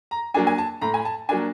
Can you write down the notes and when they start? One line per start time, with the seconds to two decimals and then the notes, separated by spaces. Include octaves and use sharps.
0.11 A#5
0.34 F#3 A#3 D4 G#5
0.47 G#5
0.58 A5
0.81 A2 A#5
0.94 G#5
1.05 A5
1.29 F#3 A#3 D4 G#5